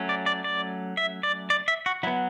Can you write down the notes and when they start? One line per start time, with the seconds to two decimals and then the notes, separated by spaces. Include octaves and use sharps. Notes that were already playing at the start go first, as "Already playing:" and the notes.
Already playing: F#3 A3 C#4
0.09 D5
0.26 D5
0.44 D5
0.97 E5
1.23 D5
1.50 D5
1.68 E5
1.86 F#4
2.03 F#3 B3 E4